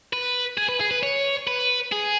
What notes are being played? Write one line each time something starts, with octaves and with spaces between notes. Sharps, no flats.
B4
G#4
B4
G#4
B4
C#5
B4
G#4